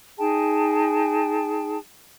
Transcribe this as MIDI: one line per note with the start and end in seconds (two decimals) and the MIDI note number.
0.18 1.78 63
0.18 1.78 68
0.18 1.78 79
0.18 1.78 81